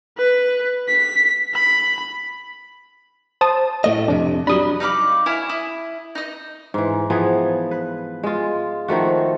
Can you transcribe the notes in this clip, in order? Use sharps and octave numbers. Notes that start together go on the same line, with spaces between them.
B4
B6
B5
C5 A5 D#6
A2 A3 D#5
F2 C3 D4
F#3 G3 D4 B5 D#6
D#4 F5 B5 D6
E4 C#5 F5 G#5
E4 D#6
D#4 D#5
G#2 E3
E3 F3 B3 G#4
B4
G#3 F4
D#3 F3 A3 F#4